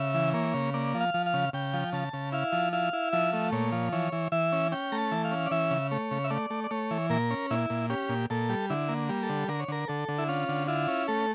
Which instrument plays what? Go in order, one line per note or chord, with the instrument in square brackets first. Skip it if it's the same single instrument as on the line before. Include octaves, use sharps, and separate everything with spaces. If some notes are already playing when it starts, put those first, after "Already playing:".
Already playing: [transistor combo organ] C#3 E5
E3
A#3 C#5
C#3
A#3 D5
F3
F5
F3
F5
C#3
C#3 G5
F3
C#3 A5
C#3
E4 F5
F3
E4 F5
E4
F3 E5
A3
A#2 C#5
F3
E3 C#5
E3
E3 E5
C#4
C#4 G5
A3 A#5
A5
E3
F5
C#4
D5
E3 E5
C#3
A3 C#5
C#3
E5
A3 D5
A3
D5
A3 C#5
E3
A#2 A#4
C#4
A#2 E4
A#2
C#4 G4
A#2
A#2 A4
G3
D3 E4
A#3
G3
A4
D3
D3 A#4
C#5
D3 A#4
D3 A4
D3
E4
C#4 F4
D3
E4 F4
C#4
A3 A4